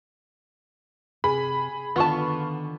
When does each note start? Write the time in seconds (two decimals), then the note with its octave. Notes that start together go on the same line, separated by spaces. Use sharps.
1.24 C3 G#4 B5
1.96 D3 D#3 B3 F4 A5 C#6